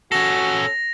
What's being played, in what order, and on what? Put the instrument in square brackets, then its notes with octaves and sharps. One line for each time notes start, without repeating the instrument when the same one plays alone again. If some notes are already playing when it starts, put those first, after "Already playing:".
[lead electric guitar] C#4 A4 [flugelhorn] F#4 [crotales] A#6 F7